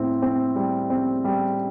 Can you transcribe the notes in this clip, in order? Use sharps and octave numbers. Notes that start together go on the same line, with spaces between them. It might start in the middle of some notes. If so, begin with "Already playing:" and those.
Already playing: A2 C4
C4
G3
C4
G3